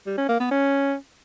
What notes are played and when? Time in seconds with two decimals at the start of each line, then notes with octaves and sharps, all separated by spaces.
0.06 G3
0.18 C#4
0.29 A#3
0.40 B3
0.51 C#4